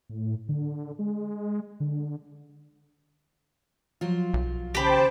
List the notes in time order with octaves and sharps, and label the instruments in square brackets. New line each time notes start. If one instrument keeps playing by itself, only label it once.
[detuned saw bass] A2
D3
G#3
D3
[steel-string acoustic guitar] F3 F#3 F4
[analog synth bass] B1
[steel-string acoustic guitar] D#2 C#3 [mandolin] G4 B5 [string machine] C5 G5 A5